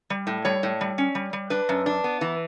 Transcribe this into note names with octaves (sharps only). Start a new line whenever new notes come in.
G3
A2
G3 C#5
A2
G3
C#4
G3
G3
D4 B4
F#2
D4
B3
E3